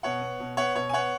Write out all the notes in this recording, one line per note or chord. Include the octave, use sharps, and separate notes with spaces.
B2 C#5 F#5
B3
B2
B3 C#5 F#5
B2 C#5
G#5
B3 C#5 F#5